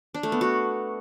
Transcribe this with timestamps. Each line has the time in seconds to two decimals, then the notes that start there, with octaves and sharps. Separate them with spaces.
0.14 D4
0.23 A3
0.32 B3
0.41 F#4